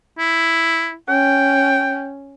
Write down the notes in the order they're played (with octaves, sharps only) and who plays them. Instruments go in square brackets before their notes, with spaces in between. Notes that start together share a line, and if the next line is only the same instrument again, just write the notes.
[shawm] E4
[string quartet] C#4 [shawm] G5